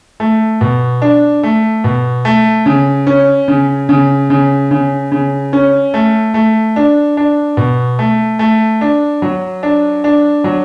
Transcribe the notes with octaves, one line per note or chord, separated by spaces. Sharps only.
A3
B2
D4
A3
B2
A3
C#3
C#4
C#3
C#3
C#3
C#3
C#3
C#4
A3
A3
D4
D4
B2
A3
A3
D4
F#3
D4
D4
F#3